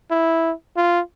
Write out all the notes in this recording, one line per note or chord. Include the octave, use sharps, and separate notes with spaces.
E4
F4